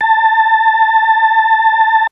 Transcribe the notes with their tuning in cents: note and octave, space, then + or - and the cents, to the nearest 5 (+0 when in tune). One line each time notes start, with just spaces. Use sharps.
A5 +15